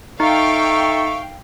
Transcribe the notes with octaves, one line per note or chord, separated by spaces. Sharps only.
D#4 A4 E5 F5 G5 C#6